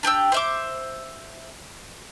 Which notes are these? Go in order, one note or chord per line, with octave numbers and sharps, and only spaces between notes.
D4 G4 G5 E6
C5 E5 D6